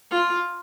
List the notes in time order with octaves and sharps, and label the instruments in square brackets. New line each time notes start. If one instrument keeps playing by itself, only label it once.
[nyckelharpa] F4